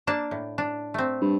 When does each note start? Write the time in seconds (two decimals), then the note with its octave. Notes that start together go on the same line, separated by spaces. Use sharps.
0.07 A#3 D4 A5
0.31 A2
0.58 D4
0.94 A3 C4
1.21 G2